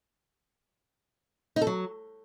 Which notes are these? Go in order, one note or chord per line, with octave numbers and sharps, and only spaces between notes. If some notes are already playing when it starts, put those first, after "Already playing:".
D#4
A4
F#3